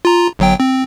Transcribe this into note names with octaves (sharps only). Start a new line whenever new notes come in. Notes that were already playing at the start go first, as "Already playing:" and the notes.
F4 A#5
G1 F#3 G5
C4